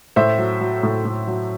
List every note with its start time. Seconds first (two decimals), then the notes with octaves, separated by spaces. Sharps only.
0.16 A2 C5 E5
0.38 F#3
0.61 F#3
0.83 A2
1.05 A2
1.27 F#3